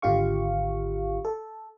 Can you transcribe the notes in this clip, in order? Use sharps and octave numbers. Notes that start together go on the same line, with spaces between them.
G#1 D3 F4 G4 F5 C#6
A4